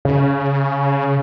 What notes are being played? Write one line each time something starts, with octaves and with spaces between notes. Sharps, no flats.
C#3